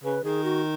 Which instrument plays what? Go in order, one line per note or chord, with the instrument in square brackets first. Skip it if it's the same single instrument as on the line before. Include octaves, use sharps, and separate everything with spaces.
[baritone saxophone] C#3 [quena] B4
[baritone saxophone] D#3 [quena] G#4
[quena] F#4